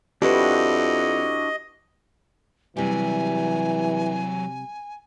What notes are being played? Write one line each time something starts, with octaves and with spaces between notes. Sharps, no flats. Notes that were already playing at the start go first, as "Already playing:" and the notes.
F2 D4 E4 F#4 G4 B4 D#5
C3 E3 F#3 G3 G4 G#5